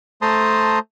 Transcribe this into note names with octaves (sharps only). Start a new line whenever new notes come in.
A3 C5 A5 A#5 C6 D#6